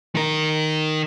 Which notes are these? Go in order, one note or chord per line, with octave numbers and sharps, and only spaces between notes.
D#3 A#4